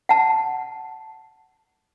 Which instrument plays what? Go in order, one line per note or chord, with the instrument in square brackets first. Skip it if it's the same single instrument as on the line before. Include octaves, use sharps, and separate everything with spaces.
[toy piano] F#5 A5